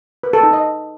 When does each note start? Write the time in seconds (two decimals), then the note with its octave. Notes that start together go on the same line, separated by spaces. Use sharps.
0.23 B4
0.33 A4
0.43 D#4
0.53 D#5